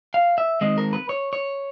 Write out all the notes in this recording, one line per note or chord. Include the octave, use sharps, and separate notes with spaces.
F5
E5
D#3 G#3 C4 D#5
A#4
B4
C#5
C#5